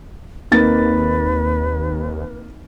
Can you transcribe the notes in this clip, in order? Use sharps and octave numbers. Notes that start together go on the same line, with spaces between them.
D#2 A#3 C4 D#4 B4 A6